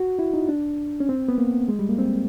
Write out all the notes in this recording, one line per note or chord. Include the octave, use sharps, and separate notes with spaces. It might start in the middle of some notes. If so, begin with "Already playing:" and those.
Already playing: F#4
E4
D#4
D4
C#4
C4
B3
A#3
G#3
G3
A#3
C4